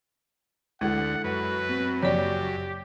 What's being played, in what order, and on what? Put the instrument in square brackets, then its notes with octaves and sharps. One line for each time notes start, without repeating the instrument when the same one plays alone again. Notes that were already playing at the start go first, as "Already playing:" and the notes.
[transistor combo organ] D2 [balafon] G#3 [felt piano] E4 A4 [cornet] F#5
[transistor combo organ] F#2 [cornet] B4
[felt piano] C4
[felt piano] F#1 [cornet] G4 [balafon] C#5 D5